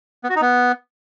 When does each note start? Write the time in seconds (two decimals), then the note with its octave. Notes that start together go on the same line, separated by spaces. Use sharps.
0.24 B3
0.30 F#4
0.36 D#4
0.42 B3